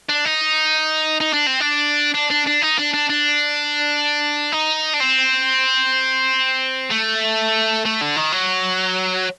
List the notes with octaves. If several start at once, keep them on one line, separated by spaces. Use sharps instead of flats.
D4
D#4
D#4
D4
C4
D4
D4
D4
D4
D#4
D4
D4
D4
D#4
D4
C4
A3
A3
D3
D#3
F#3